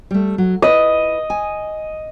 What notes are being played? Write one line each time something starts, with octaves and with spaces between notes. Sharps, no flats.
G3 A3
F#3
E4 B4 D5 D#5
G#5